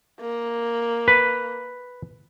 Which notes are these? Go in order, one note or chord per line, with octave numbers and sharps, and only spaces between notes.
A#3
B4